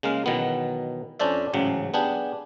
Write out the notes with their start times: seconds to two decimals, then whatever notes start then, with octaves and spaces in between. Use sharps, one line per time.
0.03 C#3 G#3 A#3 F5
0.26 B2 D#3 E3 F#3 B3
1.19 F2 C#4 D4 C5 D5 E5
1.53 A1 G#2 C#3 F#3
1.94 B3 D4 G4 G#4